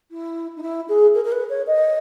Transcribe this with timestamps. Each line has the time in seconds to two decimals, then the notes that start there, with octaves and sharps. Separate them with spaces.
0.11 E4
0.56 D#4
0.63 E4
0.89 G#4
1.14 A#4
1.25 A#4
1.32 B4
1.50 C#5
1.67 D#5